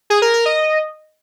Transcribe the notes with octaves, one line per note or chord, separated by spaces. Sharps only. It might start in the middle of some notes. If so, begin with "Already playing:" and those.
G#4
A#4
A#4
D#5